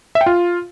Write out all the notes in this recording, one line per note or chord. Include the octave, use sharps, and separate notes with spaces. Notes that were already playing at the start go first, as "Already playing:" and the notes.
E5
G5
F4